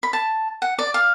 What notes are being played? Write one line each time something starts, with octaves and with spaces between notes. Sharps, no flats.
B5
A5
F#5
D5
F5